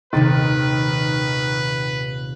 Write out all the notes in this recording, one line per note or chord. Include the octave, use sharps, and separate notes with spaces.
D#1 C3 D#3 B4 A6